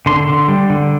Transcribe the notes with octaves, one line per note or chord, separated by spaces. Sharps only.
D3 C6
D3
G3
D3